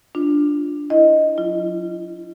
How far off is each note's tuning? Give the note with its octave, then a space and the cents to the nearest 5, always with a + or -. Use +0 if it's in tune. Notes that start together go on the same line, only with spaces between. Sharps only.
D4 +0 F4 +0
E4 +0 D#5 +0
F#3 -40 F4 -40